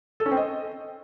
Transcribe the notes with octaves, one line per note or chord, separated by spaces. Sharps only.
A4
C#4
C4
D#5